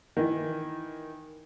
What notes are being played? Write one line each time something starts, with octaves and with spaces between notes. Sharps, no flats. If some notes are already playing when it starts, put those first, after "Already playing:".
D#3 E3